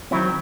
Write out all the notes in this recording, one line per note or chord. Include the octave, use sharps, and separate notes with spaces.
D#3 F#3 C4 E4